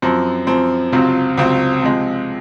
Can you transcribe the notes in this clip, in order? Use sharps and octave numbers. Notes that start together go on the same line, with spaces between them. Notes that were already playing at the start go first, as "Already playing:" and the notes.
F#2 F3 C4
F#2 F3 C4
C#2 C3 F#3 C4 F4
C#2 C3 F#3 C4 F4
C3 F3 G#3